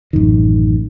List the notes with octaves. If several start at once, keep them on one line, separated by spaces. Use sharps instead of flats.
A1 F#2 D#3